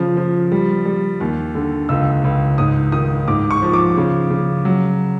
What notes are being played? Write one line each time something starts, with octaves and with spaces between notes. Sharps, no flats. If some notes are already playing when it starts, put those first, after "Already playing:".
Already playing: C#3 F3
F3
G3
G3
D#2
D3
C#2 E6
C#2
G#2 D#6
D#3 D#6
G#2 D6
C#6
F3
D6
C#3
C#3
F#3